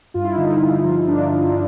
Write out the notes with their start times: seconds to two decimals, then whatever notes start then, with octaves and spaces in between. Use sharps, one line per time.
0.14 G2 F4
0.24 E4
0.35 D3 D#4
0.45 E4
0.61 G2
0.84 F3
1.08 G2 D4
1.31 F3